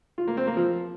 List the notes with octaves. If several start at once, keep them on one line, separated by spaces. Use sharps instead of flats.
F4
A#3
C4
A#3
F3